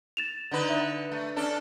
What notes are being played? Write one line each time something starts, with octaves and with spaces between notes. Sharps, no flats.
A6 E7 F7
D3 D#4 B4
D5 E5
A3
C#4 D4 A4